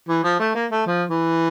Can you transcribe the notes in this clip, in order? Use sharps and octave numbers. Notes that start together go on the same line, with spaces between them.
E3
F3
A3
A#3
A3
F3
E3